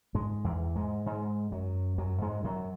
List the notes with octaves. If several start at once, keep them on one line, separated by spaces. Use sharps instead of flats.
G#2 G#3
E2 E3
G#2 G#3
G#2 G#3
F#2 F#3
F#2 F#3
G#2 G#3
F#2 F#3